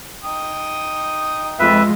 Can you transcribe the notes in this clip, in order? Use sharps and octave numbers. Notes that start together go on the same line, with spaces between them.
D#4 G5 D#6
F2 G#3 F4 B4 E5